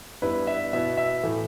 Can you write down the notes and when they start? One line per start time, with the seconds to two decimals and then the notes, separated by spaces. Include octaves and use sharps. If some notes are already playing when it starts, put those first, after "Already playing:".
0.22 G2 G3 B3 E4 B4
0.47 E5
0.73 B2 B3 E4 E5
0.97 E5
1.23 A2 E3 A3 E4